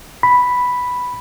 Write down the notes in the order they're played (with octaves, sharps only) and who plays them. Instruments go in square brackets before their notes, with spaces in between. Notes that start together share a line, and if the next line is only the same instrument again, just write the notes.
[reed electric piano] B5